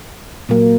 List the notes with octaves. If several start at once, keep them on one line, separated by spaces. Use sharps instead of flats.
A#2 F#3 A#3